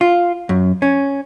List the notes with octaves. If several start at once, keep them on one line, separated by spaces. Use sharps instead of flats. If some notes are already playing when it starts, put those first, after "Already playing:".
F4
F#2
C#4